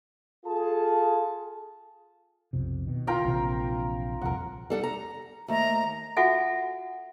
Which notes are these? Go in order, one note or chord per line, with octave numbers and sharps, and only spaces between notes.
F4 G#4 A4 A5
B1 F2 C3
B2 D#3
F4 A#4 G5
A#1 C3 E3
D#1 C2 F2 A#4 F#5
G3 A4 F#5
A#5
D#2 A3 A#5
F4 F#4 A4 E5 F#5 G#5